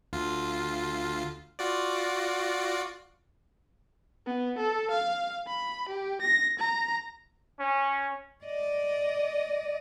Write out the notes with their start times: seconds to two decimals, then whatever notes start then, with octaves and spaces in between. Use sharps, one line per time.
0.13 D2 F4
1.59 F4 F#4 D5
4.26 B3
4.58 A4
4.91 F5
5.47 B5
5.89 G4
6.22 A#6
6.59 A#5
7.60 C#4
8.45 D5 D#5